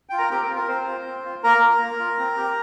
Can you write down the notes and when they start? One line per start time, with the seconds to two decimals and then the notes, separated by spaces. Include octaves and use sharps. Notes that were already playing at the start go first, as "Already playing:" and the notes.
0.09 F4 G5
0.18 A#4 A#5
0.30 C4 G4 G5
0.44 A#4
0.50 F4
0.56 A#4
0.68 C4 C5
0.87 F4
1.05 C4
1.25 F4
1.43 A#3 A#4 A#5
1.62 F4
1.81 A#3
1.99 F4
2.19 C4
2.37 G4